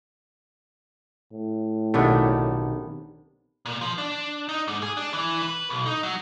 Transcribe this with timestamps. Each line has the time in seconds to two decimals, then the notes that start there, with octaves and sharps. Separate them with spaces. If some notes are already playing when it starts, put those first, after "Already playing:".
1.32 A2
1.94 B1 C3 D#3 A3 B3 C#4 D4
3.66 A#2
3.81 F3
3.98 D4
4.49 D#4
4.68 G#2
4.83 G#4
4.97 D4
5.13 E3
5.42 B4
5.70 B1
5.86 D#4
6.03 F#3